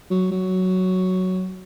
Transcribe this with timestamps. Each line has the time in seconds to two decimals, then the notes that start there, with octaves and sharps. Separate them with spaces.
0.10 F#3
0.32 F#3